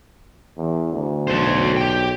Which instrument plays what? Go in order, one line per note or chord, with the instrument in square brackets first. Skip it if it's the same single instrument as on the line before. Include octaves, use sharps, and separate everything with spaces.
[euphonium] E2
D2
[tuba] B1 [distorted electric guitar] A4 C5
[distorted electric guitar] G4 G5